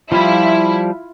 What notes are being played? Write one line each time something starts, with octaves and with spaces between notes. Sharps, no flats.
F3 G3 E4 F4 B5